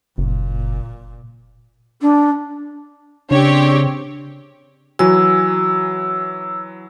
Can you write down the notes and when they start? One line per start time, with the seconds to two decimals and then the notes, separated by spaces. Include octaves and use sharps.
0.18 F#1 A#2
2.01 D4
3.31 C#3 C4 D4 G4 C#5
4.99 E3 F#3 F#4 G#5 E6